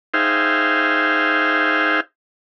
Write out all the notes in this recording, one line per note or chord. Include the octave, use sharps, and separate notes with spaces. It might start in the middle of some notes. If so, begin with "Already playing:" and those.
D#4 G#4 C5 E5 F5 G5